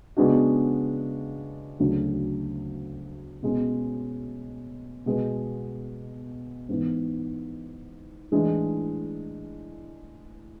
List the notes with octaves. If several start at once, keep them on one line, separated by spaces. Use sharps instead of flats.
C#3 G#3 B3 D4 F#4
D2 C#3 F#3 A3 D4
B2 G#3 C#4
B2 G#3 B3
G#2 E3 B3
A2 E3 G#3 D4